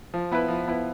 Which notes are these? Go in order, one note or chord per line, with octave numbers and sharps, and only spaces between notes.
F3
B3 E4 B4
F3
B3 E4 B4